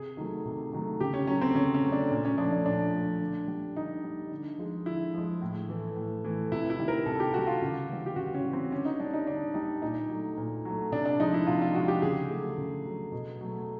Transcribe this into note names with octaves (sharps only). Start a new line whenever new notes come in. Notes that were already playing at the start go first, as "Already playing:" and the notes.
Already playing: C3 G#4
D#3 F#3 A3
C3
D#3 F#3 A3
C#3 G4
C#4
F#3 A3 C#4
C4
C#3 C#4
C#4
F#3 A3
D4
A#2
C#4
F3 A3 D4
D4
A#2 D4
F3 A3
D3
G3
D3 D#4
G3
D3
F3 G#3
D3 E4
F3 G#3
A2
E3 A3
A2
E3 A3
C3 E4
E4
D#3 G3
A#4
C3 A4
G4
D#3 G3 F#4
F4
C#3
E3 G3
G4
C#3 F#4
C#4
E3 G3
C4
D3 C#4
D#4
G3 D4
D#4
D3 D4
G3 D#4
A#2 D#4
F#3 A3
A#2
F#3 A3
C3 D4
D4
F3 G#3 D#4
E4
C3 F4
F4
F3 G#3 F#4
G4
C#3 G#4
F#3 A3
C#3
F#3 A3
B2
F#3 A3